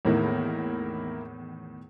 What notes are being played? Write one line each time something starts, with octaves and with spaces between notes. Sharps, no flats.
E2 A2 D#3 A#3 E4 A#4